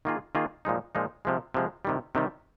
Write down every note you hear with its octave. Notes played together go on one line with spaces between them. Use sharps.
D#3 A#3 F4 G#4
D#3 A#3 F4 G#4
A#2 F3 G#3 D#4
A#2 F3 G#3 D#4
C3 F3 G#3
C3 F3 G#3
C3 D#3 G3
C3 D#3 G3